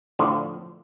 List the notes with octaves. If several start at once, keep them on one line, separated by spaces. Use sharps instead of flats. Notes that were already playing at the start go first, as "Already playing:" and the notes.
A2 D3 F3